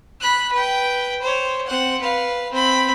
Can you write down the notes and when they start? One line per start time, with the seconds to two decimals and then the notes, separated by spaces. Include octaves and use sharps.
0.21 B5 F#6
0.52 B4 G5
1.21 C5 C#5
1.67 C4 F#5
2.01 B4 F5
2.52 C4 B5